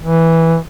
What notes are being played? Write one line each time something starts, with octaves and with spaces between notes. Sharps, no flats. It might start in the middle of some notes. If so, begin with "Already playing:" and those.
E3